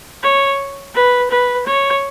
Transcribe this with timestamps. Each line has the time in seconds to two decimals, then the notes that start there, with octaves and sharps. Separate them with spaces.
0.23 C#5
0.95 B4
1.30 B4
1.67 C#5